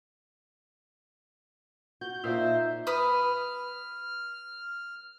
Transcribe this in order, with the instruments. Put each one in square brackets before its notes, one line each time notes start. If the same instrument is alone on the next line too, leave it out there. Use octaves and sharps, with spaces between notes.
[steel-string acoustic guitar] F#4 [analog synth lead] G6
[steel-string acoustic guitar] A#2 D#4 [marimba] F4 F5 [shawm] C5 [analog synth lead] E5
[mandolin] B4 D#6 [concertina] F6